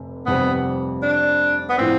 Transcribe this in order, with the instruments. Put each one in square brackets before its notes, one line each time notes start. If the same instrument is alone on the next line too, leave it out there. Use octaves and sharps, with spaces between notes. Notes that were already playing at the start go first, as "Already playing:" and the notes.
Already playing: [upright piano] F1 C3
[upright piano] F1 F2 C3 G3 C4 [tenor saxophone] B3
[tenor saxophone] D4
B3
[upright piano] A2 F3 [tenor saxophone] C4